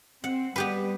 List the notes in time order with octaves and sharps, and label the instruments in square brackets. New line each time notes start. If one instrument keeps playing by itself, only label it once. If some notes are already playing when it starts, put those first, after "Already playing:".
[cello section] C4 [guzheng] F#5
[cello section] G3 [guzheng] B3 G4 B4